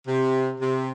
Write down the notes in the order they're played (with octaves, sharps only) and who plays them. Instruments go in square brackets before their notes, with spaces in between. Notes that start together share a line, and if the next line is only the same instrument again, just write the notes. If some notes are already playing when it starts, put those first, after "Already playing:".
[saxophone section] C3
C3